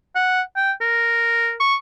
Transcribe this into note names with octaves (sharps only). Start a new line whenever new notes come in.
F#5
G5
A#4
C#6